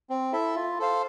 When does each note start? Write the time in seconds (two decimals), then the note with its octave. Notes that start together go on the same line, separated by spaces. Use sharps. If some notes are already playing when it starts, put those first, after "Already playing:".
0.09 C4
0.33 E4 A4 E5
0.55 F4
0.80 A4 C5 F5